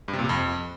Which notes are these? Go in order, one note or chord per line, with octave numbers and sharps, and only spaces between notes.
G2
C3
A#2
C3
F2